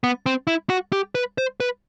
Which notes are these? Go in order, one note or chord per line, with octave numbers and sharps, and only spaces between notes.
B3
C4
E4
F#4
G4
B4
C5
B4